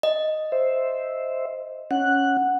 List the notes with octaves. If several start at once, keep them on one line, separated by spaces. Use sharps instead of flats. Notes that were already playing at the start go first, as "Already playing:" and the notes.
D#5
C5 E5
C#4 F#5 F#6